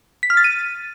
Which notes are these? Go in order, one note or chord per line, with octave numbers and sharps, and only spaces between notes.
B6
F6
A6
D#7